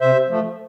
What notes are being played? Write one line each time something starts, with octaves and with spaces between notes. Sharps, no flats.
C3 C5 E5
F3 A3